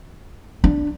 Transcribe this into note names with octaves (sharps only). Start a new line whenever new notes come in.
D4